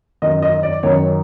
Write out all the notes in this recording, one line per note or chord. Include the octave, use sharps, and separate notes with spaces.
F#2 D#3 D#5
D#5
D5
F#2 D#3 C#5